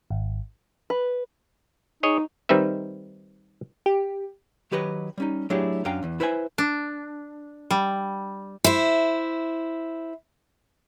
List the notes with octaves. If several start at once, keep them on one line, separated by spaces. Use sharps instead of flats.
G#1
B4
D#4 G#4 C#5 D#5
D#3 G3 C4 D#4 B4 E5
G4
D#3 F#3 G4 B4 C#5 D#5
G3 C#4 D#4
F#3 A3 D4 E4 G4 G#4
F#2 C#4 D4 F5 G5 A#5
E2 E3
E4 B4 C5 E5 F5 G#5
D4
G3
E4 C5